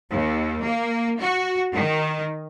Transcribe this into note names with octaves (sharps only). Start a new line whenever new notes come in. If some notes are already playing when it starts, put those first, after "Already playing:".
D#2
A#3
F#4
D#3